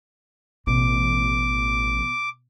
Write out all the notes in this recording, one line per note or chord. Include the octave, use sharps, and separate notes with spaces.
A1 B2 D6